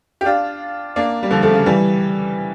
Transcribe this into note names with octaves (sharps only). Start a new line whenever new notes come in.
G4
D4 F4
A#3 D4
G3
D3 F3
F3 A3
C#3
E3 G3